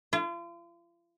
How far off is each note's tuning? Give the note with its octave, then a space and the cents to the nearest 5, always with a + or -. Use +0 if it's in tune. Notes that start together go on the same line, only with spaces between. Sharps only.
F4 -40